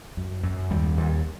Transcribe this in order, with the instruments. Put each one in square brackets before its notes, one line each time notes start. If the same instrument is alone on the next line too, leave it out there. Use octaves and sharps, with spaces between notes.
[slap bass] F#2
F#2
D#2 G3
D#2